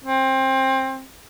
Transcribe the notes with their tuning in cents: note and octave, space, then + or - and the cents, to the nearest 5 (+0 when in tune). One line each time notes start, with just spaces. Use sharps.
C4 +20